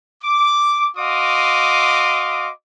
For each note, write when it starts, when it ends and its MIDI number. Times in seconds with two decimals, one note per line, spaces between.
0.23 0.88 86
0.97 2.50 66
0.97 2.50 75
0.97 2.50 77
0.97 2.50 84
0.97 2.50 86
0.97 2.50 87